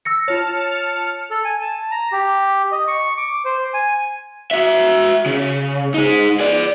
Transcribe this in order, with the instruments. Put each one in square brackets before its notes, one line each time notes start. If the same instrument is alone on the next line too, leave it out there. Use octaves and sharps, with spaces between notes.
[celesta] E6 A#6 C#7
[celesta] F4 C#5 [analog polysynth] A5 F6 C#7
[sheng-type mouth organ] A4
G#5
A5
A#5
G4
D#5
C#6
D6
C5
G#5
[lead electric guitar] F#4 E5
C#3
D#4 G#4
G#4 D5